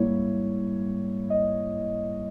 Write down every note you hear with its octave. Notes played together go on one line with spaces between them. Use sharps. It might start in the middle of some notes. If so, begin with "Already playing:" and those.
Already playing: G#2 G3 A#3 E4 C#5
D#5